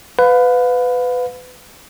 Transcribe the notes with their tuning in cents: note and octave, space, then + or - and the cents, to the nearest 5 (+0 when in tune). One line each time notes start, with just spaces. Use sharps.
B4 +20 F5 +35